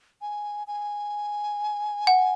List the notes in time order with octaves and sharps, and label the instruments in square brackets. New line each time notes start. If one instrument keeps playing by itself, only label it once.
[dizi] G#5
G#5
[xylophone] F#5